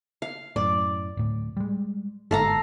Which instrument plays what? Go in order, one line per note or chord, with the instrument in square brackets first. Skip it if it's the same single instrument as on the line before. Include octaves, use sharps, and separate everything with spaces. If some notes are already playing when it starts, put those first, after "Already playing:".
[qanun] F5
[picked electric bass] F#2 A2 [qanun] D5
[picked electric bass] D1 A2
G3 G#3
[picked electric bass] G1 G#2 [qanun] A4 F5 A#5